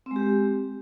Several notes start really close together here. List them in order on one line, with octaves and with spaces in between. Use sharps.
C4 G#3 G4